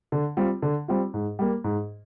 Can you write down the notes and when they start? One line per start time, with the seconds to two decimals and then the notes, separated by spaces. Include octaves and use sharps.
0.12 D3
0.37 G3 C4 F4
0.62 D3
0.88 G3 C4 F4
1.14 G#2
1.39 G3 A#3
1.64 G#2